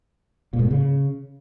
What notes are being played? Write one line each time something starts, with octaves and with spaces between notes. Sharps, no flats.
A#2
G#2
A#2
C#3